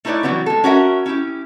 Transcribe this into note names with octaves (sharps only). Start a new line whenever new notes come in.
A3 D#4 E4 B4 C#5 D5
E3 F#3 G3 B3 C4
G#3 A4
C#4 F#4 A#4 E5
C#4 E4 G4